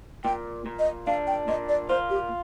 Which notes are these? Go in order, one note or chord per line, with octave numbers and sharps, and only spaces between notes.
A#2 G5
A#2
D#5
D4 F5
G5
A#2 D#5
D5
F4 C5
G4